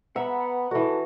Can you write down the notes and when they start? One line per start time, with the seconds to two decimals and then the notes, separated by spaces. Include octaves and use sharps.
0.16 B3 E5 F#5 A#5 B5
0.71 E3 F#4 A4